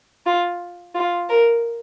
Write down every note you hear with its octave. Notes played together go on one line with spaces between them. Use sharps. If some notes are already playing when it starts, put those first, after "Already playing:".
F4
F4
A#4